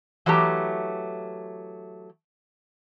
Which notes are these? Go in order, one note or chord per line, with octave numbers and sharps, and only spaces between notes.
E3 F#3 A3 G4 A#5